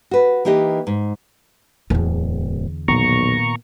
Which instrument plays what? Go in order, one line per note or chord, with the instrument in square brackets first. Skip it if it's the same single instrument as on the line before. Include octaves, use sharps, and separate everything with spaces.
[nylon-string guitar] F#4 B4
E3 A#3 D#4 G4 D#5
G#2
[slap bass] D1 [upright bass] E2 D3
[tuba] B1 [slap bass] A#2 D#3 B3 [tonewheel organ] A#5 C#6